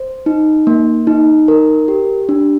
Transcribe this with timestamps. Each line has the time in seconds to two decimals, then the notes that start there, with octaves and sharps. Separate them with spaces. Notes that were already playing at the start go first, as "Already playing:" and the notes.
Already playing: C5
0.26 D#4
0.67 A#3
1.07 D#4
1.48 A#4
1.88 G4
2.29 D4